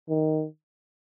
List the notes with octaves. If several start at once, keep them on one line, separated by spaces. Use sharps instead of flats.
D#3